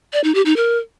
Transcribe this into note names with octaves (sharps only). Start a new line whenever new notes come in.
D5
D#4
G4
D#4
A#4